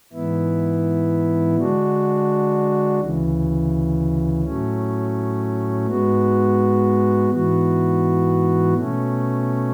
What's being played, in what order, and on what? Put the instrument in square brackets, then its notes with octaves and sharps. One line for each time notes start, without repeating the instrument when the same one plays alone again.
[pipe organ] G#2 E3 B3 E4
D3 G#3 D4 F#4
D2 C#3 E3
A2 F#3 A3 C#4
G#2 G#3 B3 F#4
G#2 E3 B3 F#4
B2 A3 C#4